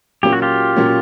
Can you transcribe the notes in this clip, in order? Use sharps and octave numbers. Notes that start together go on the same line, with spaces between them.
A#2 F#3 A#3 C#4 G4
F#4
F4 G4
A#2 F#3 A#3 C#4